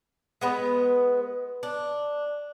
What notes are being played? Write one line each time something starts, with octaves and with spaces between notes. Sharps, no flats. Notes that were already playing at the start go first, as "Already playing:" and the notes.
G#3 B3 B4
D4